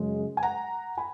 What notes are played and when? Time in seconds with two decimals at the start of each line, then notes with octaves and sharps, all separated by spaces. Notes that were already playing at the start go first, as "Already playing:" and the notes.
Already playing: F#2 C#3 G#3
0.37 G#5
0.43 F#5 A#5
0.97 G#5 B5